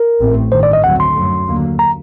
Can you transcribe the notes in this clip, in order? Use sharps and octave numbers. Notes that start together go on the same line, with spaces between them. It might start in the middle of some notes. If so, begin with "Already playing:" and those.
Already playing: A#4
A1 A2 A3 C4
A1 G2 D#3 C5
D5
D#5
D2 D3 F#3 A3 C4 F#5
C6
F#2 F#3 A3
D#2 D3 F#3 A#3
A#5